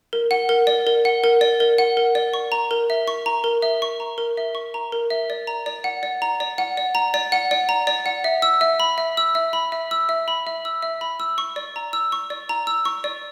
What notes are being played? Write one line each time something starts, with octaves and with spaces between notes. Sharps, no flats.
A#4
F#5
A#4
D5
A#4
F#5
A#4
D5
A#4
F#5
A#4
D5
C#6
A#5
A#4
E5
C#6
A#5
A#4
E5
C#6
A#5
A#4
E5
C#6
A#5
A#4
E5
D5
A#5
D5
F#5
D5
A#5
D5
F#5
D5
A#5
D5
F#5
D5
A#5
D5
F#5
E5
E6
E5
B5
E5
E6
E5
B5
E5
E6
E5
B5
E5
E6
E5
B5
E6
C#6
D5
A#5
E6
C#6
D5
A#5
E6
C#6
D5